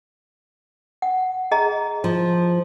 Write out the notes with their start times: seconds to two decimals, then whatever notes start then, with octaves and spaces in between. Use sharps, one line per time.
1.02 F#5
1.51 G#4 D#5 A#5
2.04 F3